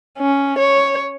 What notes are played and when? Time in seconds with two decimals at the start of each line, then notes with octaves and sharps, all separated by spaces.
0.19 C#4
0.58 C#5